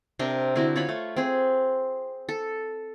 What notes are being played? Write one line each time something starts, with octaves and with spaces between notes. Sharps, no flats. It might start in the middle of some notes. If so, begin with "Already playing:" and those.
C3 C4 D4 A#4
D3 C4 E4 F#4
F4 C#5 B5
A3
C4 G#4
A4